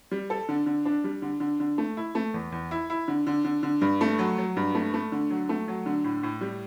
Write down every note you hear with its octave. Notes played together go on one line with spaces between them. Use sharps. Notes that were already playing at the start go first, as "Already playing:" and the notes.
G3
A4
D3
D3
D4
G3
D3
D3
D3
A3
E4
A3
E2
E2
E4
E4
D3
D3
D3
D3
G2
A3
F#3
F#3
G2
A3
A3
D3
F#3
A3
F#3
D3
A2
A2
G3